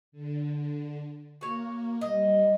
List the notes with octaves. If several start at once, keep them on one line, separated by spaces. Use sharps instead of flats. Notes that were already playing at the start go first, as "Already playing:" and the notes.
D3
A#3 F#4 C#5
G3 D#5